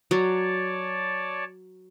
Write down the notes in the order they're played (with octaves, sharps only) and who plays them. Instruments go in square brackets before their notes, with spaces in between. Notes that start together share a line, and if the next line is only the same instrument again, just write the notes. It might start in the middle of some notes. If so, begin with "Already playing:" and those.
[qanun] F#3 [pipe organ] C#5 D5 A5